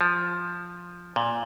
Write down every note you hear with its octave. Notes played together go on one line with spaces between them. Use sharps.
F3
A#2